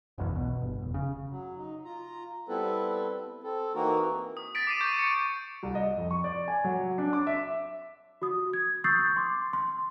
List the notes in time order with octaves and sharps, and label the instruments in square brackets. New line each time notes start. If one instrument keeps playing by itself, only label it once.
[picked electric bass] F#1 B1 E2
B2
G1
F1
C#3
[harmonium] F#3
D#4
F4 A#5
G3 B3 C4 E4 A4 B4
C4 A4
E3 A#3 C4 D#4 F#4 A#4
[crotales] D#6
A6 B6 D7
D6 C7 D#7
C#6 G6 D7
C#6 C#7
[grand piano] C2
D#5
F2
C#6
D5
G#5
F#3
D4
D6
E5
[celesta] F#4 D#6
G#6
C#6 D#6 E6 G6 A6 C7
C6 D6
C6